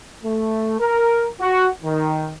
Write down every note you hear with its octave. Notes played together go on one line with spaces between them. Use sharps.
A3
A#4
F#4
D#3